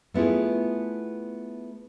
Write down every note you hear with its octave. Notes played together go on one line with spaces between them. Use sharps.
A3 B3 E4 F4 G#4